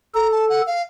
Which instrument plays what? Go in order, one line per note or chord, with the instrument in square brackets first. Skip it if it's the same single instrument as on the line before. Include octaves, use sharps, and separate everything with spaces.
[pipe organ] A4 [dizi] A#5
[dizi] A5
F#5
F5